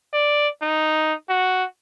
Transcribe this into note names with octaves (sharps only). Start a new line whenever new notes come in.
D5
D#4
F#4